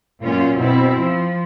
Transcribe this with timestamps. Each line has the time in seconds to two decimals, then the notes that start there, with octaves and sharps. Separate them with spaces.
0.22 F#2 A#2 C#4 F4
0.57 B2 C4 E4
0.99 F3